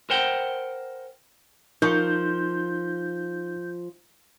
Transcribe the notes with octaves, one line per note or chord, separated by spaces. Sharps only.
A#4 C5 F#5 G5
F3 D#4 A#4 C#6 G6